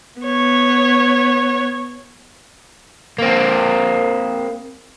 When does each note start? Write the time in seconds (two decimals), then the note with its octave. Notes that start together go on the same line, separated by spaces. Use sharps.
0.21 B3 C#5
3.18 A#3 C4